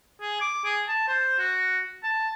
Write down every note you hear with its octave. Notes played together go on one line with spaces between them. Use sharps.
G#4
D6
G#4
A5
C5
F#4
A5